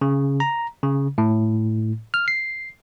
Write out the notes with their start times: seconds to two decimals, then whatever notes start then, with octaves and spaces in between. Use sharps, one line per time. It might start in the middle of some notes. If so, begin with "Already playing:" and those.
0.01 C#3
0.40 A#5
0.83 C#3
1.18 A2
2.14 F6
2.28 C7